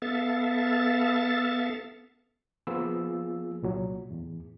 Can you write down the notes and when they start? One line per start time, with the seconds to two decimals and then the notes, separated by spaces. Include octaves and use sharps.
0.02 B3 A4 E5 F5 A6
2.67 F3 A#3 B3 F4 G#4 E6
3.62 C2 A#2 F#3
4.09 E2 A2